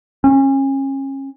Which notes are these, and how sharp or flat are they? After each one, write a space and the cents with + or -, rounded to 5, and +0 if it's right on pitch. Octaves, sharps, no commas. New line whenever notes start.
C#4 -30